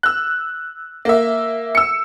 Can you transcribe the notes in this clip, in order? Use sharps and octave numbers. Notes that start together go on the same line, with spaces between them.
E6 F#6
A#3 E5
E6 C#7